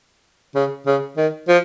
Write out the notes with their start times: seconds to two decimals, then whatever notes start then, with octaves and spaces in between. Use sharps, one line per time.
0.55 C#3
0.87 C#3
1.17 D#3
1.48 F3